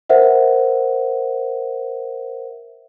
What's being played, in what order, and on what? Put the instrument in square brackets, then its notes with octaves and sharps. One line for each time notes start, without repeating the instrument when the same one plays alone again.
[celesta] A#4 C5 E5 F#5